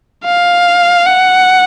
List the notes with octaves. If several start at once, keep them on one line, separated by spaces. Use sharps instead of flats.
F5
F#5